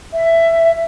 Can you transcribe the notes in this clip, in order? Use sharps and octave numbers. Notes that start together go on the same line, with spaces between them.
E5